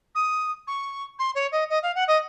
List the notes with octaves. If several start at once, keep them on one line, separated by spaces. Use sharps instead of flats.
D#6
C#6
C6
C#5
D#5
D#5
F5
F#5
D#5